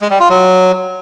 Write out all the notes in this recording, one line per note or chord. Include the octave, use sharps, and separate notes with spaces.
G#3
G3
F4
F#3